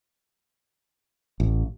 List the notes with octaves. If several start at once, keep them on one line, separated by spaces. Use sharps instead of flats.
A1